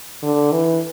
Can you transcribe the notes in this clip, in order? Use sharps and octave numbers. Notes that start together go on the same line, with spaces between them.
D3
E3